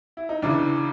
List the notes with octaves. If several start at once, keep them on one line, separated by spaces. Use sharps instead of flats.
E4
D#4
E2 C#3 E3 D4